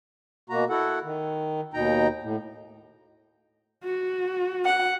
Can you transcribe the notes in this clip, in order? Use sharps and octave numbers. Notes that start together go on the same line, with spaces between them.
B2 A#3 F#4 A#5
E4 F#4 A4 F#5
D#3
D#2 B2 D#4 G5 A#5
A2
F#4
F#5